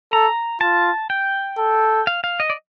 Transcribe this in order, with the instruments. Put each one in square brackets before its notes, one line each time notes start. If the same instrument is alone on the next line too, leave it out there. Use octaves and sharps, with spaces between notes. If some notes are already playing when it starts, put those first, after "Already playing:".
[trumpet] A4 [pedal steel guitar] A#5
[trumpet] F4 [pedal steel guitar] A5
[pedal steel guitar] G5
[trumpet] A4
[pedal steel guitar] F5
F5
D#5
D5